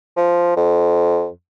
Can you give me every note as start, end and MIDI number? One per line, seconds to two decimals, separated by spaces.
0.17 0.55 53
0.56 1.28 41